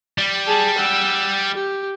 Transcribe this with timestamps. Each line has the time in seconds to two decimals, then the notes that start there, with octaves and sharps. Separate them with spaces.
0.18 G3
0.47 G#4 A5
0.79 F#5 E6
1.55 G4